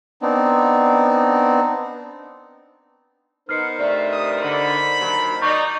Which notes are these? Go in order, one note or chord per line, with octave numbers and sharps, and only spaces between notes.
B3 C4 D4 D#4
B3 D#4 A#4 C5 F6 C7 C#7
G2 C3 A3 D5
D#6
D3 B5
D#2 F#3
D#4 D5 C#6 G6